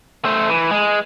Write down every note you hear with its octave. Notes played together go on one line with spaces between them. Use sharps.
A3 C5
E3
G#3